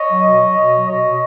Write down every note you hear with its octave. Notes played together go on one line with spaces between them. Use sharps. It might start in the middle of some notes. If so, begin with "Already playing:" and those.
Already playing: C#5 D#5
F#3
B2
F#3
B2
F#3
B2 C#5 D#5
B2